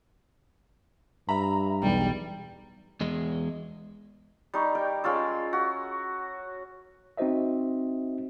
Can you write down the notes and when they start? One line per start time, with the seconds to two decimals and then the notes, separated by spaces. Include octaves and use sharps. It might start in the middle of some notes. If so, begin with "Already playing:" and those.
1.29 G2 E5 A#5 B5
1.83 B1 E2 G3
3.01 E2 G#3
4.54 G3 D#4 C#6
4.75 A#4 D5 G5
5.04 G#3 C#4 F4 E6
5.53 F#4
7.17 C4 D#4 F#4 C5 D#5 E5